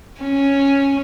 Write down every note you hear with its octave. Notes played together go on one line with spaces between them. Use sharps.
C#4